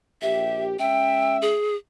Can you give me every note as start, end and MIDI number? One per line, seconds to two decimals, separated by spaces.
0.22 0.77 34
0.22 0.77 67
0.22 0.64 76
0.79 1.54 56
0.79 1.54 61
0.79 1.54 76
0.79 1.37 79
1.42 1.75 68